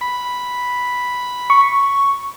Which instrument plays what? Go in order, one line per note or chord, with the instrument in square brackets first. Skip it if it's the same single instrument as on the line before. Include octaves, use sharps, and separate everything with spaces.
[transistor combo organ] B5
[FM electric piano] C#6